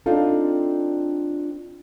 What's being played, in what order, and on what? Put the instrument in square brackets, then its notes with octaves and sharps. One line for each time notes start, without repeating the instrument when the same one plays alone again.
[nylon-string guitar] C4 D4 D#4 F4 A4